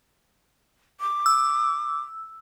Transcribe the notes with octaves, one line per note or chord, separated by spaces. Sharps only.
D6
E6